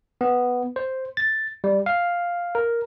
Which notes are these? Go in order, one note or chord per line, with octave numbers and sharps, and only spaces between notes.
B3
C5
A6
G3
F5
A#4